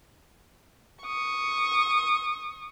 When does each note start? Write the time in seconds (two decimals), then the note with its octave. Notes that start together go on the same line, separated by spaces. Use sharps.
1.03 C#6 D#6